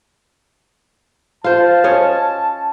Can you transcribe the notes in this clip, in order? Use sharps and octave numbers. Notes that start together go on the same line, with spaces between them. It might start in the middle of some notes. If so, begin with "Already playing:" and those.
F4 C5 A5
C#4 C#5 D#5